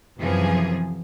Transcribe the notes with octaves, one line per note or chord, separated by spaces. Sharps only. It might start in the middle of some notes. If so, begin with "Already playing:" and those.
F#2 C3 E3 F3 G#4